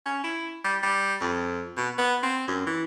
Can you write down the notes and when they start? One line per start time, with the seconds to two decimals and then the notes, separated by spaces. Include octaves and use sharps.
0.06 C#4
0.24 E4
0.64 G3
0.83 G3
1.21 F2
1.77 B2
1.98 B3
2.23 C4
2.48 F#2
2.66 E3